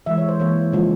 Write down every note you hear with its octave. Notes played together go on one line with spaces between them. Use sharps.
E3 G#3 E5
C#5
C5
E3 A#3 C#5
C#3 F3 G#3